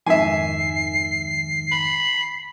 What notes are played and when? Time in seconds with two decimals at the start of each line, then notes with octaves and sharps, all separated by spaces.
0.06 F2 G#2 D#3 E5 G#5 C7
1.72 B5